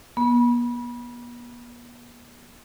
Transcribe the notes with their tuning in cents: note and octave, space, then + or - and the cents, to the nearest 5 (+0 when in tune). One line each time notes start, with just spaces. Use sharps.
B3 -45